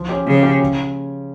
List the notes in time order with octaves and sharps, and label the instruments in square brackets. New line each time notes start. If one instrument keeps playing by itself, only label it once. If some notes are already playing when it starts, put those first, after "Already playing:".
Already playing: [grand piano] F3
C#4 G4
[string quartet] C#3 [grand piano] F3
[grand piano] C#4 G4
C#3